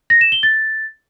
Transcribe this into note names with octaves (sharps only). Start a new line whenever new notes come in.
A#6
E7
G7
A6